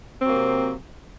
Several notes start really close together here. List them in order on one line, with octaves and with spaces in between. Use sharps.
C4 F#3 A#3 C3